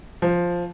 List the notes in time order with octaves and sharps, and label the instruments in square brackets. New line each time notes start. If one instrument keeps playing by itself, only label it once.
[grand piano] F3